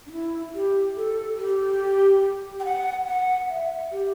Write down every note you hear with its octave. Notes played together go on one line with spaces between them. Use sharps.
D4
E4
G4
A4
G4
G5
F#5
F#5
E5
G4